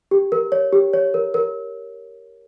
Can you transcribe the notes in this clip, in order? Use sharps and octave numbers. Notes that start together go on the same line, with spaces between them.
G4
A#4
C#5
G4
C#5
A#4
A#4